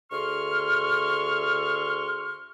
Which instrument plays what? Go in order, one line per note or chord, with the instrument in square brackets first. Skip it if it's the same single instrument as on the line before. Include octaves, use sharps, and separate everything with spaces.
[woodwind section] D2 G#4 C6 C#6 F6